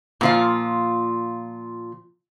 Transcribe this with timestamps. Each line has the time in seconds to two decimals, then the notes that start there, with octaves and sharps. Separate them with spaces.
0.21 A#2 F3 F4